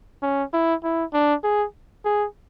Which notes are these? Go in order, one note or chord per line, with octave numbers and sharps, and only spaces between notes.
C#4
E4
E4
D4
G#4
G#4